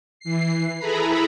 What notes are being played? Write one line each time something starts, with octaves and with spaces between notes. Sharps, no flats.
E3 C7
E4 G#4 A4 B4 A#5 B5